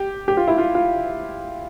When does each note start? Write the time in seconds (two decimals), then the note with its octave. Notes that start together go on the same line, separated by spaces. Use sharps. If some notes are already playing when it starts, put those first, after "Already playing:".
Already playing: G4
0.28 G4
0.37 F4
0.48 E4
0.58 F4
0.75 F4